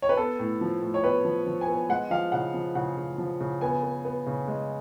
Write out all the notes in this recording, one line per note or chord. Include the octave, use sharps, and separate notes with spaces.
C#5
B4
B3 A4
A2
F3
A2
C#5
B3 B4
F3
F3
G#5
B3
G#3 F#5
F3 F5
C#3 F#5
F3
C#3 F#5
C#3
F3
C#3
B3 G#5
B3
B3
C#3
G#3